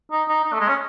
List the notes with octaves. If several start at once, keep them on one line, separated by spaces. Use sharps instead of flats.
D#4
D#4
D#4
A3
G#3
C#4